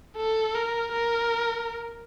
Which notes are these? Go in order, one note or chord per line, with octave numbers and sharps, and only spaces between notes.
A4
A#4
A#4